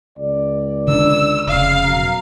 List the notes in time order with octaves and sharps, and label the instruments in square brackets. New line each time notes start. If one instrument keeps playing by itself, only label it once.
[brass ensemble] C#2 D5
[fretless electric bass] D3 D4 [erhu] E6
[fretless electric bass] F1 C#3 [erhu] F5
[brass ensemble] F#2 B2 A#5